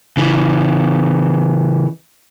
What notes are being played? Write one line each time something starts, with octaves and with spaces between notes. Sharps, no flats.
C#3 E3